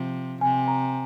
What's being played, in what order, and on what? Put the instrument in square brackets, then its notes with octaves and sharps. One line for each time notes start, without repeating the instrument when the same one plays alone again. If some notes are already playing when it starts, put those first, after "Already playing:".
Already playing: [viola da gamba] C3 F3
[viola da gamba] C3 [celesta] G#5
[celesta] A#5